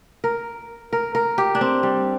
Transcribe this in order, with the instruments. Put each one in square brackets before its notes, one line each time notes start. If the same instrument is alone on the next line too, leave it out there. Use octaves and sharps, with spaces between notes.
[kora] A#4
A#4
A#4
G4
D4
C4
G3